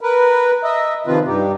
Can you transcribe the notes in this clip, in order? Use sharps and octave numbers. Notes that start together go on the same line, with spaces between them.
A#4 B4
D#5 E5
C3 D#3 F3 C4 F4 B4
G2 D#4 G4